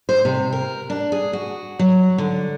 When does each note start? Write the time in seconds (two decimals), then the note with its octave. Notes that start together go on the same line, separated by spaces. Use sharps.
0.09 C5
0.25 C3
0.52 A#4
0.90 D4
1.12 G#4
1.33 F#4
1.79 F#3
2.18 D3